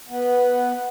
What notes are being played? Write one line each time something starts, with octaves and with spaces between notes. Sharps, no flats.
B3